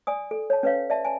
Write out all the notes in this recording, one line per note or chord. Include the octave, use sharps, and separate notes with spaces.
D5 G#5 D#6
A4
C#5 A5
C#4 B4 C#5 F5
D5 E5 A5
G#5 A5